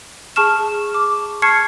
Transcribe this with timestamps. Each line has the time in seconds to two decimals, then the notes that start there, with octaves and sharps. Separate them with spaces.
0.36 G#4 A5 C#6 F6 E7
0.94 D6
1.42 A5 C#6 F6 G#6 C7 C#7